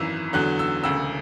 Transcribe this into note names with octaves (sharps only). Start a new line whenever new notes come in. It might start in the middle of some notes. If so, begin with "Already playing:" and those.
Already playing: G#1 F#2 E3 E6
E2 D3 F#3 F#6
E6
E1 D2 C#3 E6